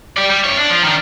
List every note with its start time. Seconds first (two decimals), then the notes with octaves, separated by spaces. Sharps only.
0.17 G4 D5
0.30 G3
0.44 G2 C#5
0.57 D4
0.70 F3
0.82 D#3 D4